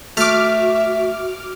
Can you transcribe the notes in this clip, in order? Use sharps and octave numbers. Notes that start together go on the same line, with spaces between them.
A3 F#4 E5 D6 F6